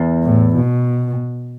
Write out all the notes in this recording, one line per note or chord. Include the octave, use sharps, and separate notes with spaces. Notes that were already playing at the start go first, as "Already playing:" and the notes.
Already playing: E2
A2
B2